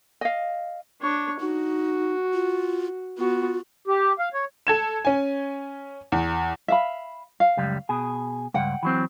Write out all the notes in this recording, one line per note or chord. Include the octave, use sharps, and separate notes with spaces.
D#5 F5
D4 C#5
D#4 F#4
F4
B3 F4 F#4
G4
F5
C#5
A4 G#6 E7
C#4 G#5
E2
E5 F5 B5
F5
C#2 F#2 G3
B2 G#4
C#2 G2 F#5 G5
E3 F#3 C4